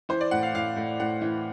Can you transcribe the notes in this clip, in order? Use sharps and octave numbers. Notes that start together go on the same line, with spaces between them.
E3 C5
D5
A2 F#5
F5
A2 F5
A2
A2 F#5
E3